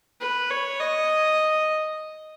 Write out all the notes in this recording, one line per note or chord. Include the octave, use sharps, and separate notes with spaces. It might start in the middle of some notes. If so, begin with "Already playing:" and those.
B4
C#5
D#5